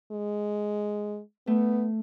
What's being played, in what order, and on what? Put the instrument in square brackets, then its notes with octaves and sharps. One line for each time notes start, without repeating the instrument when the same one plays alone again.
[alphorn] G#3
[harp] A3 [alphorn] B3